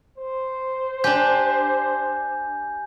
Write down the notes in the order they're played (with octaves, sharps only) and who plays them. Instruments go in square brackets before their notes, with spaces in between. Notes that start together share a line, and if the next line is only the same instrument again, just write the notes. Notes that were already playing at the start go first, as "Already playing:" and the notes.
[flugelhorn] C5
[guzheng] D4 G4 [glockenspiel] G#5 G6